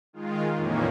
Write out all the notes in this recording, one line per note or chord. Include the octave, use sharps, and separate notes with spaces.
D#3 G#3 F4
F2 A#2 D#3 E3 A#3 C#4